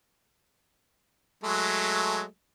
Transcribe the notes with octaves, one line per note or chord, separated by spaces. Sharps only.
F#3 G#3 A3